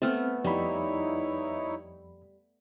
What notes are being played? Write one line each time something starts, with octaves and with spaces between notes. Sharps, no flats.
A3 B3 C4 F6
F2 G3 D#4 E4 C#5 B5